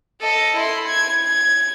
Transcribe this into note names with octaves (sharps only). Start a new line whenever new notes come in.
A4 D#5
E4 C6
G#6
G#6